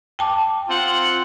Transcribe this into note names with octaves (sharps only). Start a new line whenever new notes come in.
G5 A5 D6
C4 F4 F#5